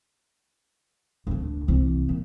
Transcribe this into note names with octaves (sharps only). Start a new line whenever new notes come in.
D2 D4
C2 E3
A#2